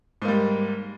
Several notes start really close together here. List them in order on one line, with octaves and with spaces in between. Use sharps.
G#2 A#3 G3